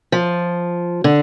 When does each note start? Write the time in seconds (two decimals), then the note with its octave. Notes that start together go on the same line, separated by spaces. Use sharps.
0.12 F3
1.04 D3